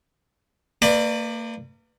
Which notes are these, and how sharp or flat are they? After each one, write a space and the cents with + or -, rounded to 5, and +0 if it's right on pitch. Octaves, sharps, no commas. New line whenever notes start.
A#3 -35 B4 +0 D5 +20